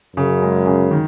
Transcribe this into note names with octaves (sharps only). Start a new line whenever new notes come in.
F#2 C#3
G#3
C#3
D#3